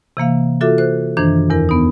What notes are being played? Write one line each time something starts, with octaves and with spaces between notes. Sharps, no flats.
C3 E3 A#3 F5
F4 F#4 A4 E5 D6
C5 F#6
F#2 D#3 E3 D4 C5 G#6
E2 E4 A#4
B3 D#4